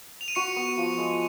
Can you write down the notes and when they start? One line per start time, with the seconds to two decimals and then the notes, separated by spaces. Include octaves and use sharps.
0.21 F7
0.28 D#7
0.35 F#4 C#6 C#7
0.56 B3
0.77 F3
0.98 G#3